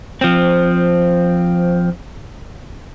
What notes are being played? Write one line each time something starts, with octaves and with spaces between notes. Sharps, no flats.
F3 C4